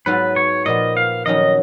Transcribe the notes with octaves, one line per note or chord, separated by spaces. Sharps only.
G#2 F#3 B3 F4 B4
C#5
A#2 F3 B3 D#5
F5
F2 D#3 F#3 C#4 D#5